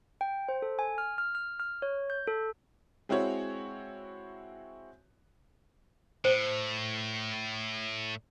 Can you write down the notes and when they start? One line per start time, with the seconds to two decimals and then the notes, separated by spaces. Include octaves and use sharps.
0.21 G5
0.49 C5
0.62 A4
0.79 G#5
0.98 F6
1.18 F6
1.35 F6
1.60 F6
1.82 C#5
2.10 G6
2.27 A4
3.09 G#3 C4 E4 F#4 C#5
6.25 A2 C5